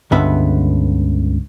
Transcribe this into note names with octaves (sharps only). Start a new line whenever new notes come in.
C#2 G2 D3 B3 E5